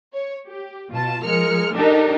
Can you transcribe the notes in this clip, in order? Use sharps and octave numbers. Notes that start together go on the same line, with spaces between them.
C#5
G4
B2 F4 A5
F3 G#3 A#4 F6 C#7
D4 D#4 G4 A4 A#4